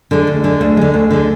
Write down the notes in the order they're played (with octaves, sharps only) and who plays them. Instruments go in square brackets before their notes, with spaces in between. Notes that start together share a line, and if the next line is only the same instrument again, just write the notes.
[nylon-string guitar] D3 G#3
D2
D3 G#3
D2
D3 G#3
D2
D3 G#3